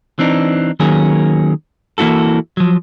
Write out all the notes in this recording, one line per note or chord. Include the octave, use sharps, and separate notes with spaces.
E3 C4 D4 D#4
D#3 F#3 A#3 C#4 G#4
E3 A#3 E4 F#4 A4
F3 F#3